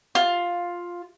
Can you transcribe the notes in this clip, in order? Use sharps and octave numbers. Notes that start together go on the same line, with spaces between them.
F4